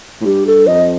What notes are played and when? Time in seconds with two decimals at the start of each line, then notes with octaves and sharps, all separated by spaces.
0.21 A2
0.25 G2 G4
0.47 A4
0.67 F2 D#5